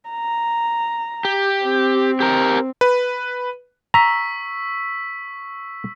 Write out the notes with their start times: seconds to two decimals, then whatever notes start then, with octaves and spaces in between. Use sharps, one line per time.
0.10 A#5
1.25 G4
1.65 C4
2.20 G4 A#4
2.81 B4
3.94 A#5 C#6 E6 B6